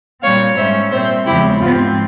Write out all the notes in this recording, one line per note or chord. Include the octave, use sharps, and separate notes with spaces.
A#2 G3 C4 C#5 F5
G#2 G3 C#4 C5 E5
A#2 G3 C4 C5 E5
E2 C#3 F3 G#3 C4 E4 G4
G#2 F3 C4 F4